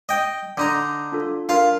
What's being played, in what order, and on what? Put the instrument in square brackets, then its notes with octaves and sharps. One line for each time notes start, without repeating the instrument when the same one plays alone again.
[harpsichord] D#5 G5
[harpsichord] D3 D#4 A#5 [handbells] C6
[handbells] D4 F4 A4
[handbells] D4 A#4 [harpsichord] F4 F5